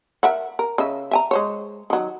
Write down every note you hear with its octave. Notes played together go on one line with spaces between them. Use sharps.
A#4 E5 F#5
A#4
C#3 D#5 E5
E5 G#5 A#5
G#3 C5 C#5
D#3 F#3